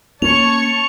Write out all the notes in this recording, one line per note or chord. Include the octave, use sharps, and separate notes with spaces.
A#3 C#4 C#5 A5 C#6 F7